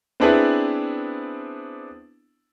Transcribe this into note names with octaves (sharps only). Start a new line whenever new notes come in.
B3 C4 D4 E4 G#4 B4